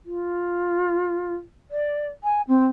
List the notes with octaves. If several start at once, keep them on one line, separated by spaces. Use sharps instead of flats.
F4
D5
G#5
C4